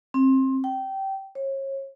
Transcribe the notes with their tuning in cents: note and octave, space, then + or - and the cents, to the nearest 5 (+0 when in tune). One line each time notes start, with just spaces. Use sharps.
C4 +25
G5 -20
C#5 -35